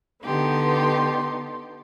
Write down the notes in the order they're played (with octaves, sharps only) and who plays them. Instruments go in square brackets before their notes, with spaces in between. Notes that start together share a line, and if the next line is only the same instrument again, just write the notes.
[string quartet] D3 B3 D#4 G4 C6